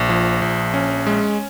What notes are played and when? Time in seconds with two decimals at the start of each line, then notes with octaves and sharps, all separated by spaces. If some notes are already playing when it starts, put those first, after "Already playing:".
Already playing: A#1
0.09 F3
0.42 A#1
0.74 C#4
1.06 G#3